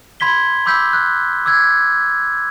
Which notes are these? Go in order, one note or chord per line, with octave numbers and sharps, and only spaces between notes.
B5 C6 G#6 B6 G7
B5 D6 E6 G6 B6
F#6
D6 E6 F#6 G#6